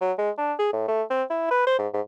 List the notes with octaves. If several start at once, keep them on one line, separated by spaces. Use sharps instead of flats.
F#3
G#3
D4
G#4
A2
A3
C4
E4
B4
C5
G#2
G#2